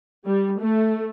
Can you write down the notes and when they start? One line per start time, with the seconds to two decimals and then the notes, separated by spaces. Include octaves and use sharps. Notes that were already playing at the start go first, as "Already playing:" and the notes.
0.25 G3
0.59 A3